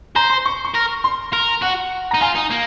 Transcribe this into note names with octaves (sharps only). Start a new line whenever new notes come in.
C5 A#5
C6
C#6
C#6
A#4
C6
A#4
F#4 F#5
D#4 A#5
F4 G#5
D#4
A#3